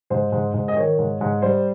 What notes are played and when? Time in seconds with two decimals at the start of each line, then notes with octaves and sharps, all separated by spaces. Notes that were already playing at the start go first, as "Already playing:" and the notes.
0.10 G#2 C5
0.32 G#2
0.54 G#2
0.68 D#5
0.77 D#3 C#5
0.99 G#2
1.21 G#2
1.42 G3 C5